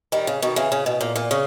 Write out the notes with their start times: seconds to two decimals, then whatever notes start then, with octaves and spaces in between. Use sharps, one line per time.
0.12 D#3 G3
0.27 C#3
0.42 B2 D#3
0.56 C#3 E3
0.72 C#3
0.86 B2
1.01 A#2
1.16 A#2
1.31 C#3